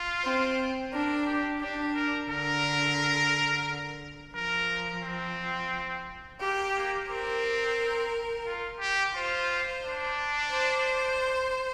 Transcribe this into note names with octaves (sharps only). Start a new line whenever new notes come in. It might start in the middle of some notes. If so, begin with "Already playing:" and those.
Already playing: F4
C4
D4 A#4
G4
D4 G4
A#4
D3 A#4
F3 A#4
C4
A#3 G4
A#3
C4 A#4
F4
G4
F4 C5
D4
C5